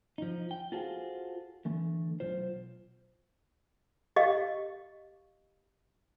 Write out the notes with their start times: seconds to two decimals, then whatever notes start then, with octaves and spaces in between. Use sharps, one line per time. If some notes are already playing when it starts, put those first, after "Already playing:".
0.18 F3 D#4
0.51 G5
0.72 F4 F#4 G#4 A4 C5 F5
1.65 D3 E3 A3
2.20 B1 F4 C5
4.16 G4 D#5 F5